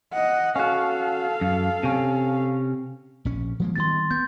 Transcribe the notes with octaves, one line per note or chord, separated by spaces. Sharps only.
D#5 F#5
C#4 F#4 A4 F5
F#2
C3 C#4
A#1 C#4
F3 G#3 A#3
D#3 G3 B3 C6 A6
B3 G6